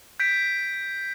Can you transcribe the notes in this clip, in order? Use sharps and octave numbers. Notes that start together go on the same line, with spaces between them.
G6 B6 D7